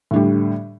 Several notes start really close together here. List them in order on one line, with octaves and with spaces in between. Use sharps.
A2 D3 G3